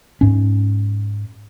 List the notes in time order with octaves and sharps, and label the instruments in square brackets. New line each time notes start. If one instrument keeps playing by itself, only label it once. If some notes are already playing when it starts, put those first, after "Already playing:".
[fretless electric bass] G#2 C#4